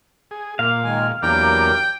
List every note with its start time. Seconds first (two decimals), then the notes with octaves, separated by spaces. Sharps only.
0.31 G#4
0.59 A#2 A#3 F5
0.84 D#3 G#3 G#5
1.23 E2 F#3 A#3 D4 G4 A#4 G5